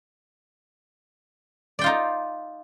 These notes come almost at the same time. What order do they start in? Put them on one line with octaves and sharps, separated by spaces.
D5 G5 F4 D#4